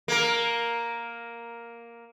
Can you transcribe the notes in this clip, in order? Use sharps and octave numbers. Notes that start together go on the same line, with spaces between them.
A#3 A#4